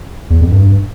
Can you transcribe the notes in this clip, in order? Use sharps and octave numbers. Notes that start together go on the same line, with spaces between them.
E2
F2
G2